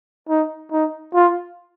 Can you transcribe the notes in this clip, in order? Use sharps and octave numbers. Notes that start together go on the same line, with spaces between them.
D#4
D#4
F4